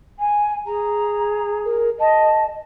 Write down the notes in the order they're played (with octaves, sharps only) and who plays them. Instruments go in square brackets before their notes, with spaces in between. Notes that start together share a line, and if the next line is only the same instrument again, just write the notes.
[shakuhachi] G#5
[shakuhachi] G#4 [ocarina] A#5
[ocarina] A#4
[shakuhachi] D#5 [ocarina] A5